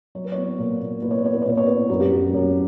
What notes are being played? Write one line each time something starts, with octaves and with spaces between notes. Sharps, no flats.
F#3 C#5
B4
C#5
B3
A#2
A#2
A#2 B4
C#5
B4
B3 C#5
B4
C#5
A#2 B4
C#5
B3 B4
F#2 F#4
G4
F#2 F#4
F#2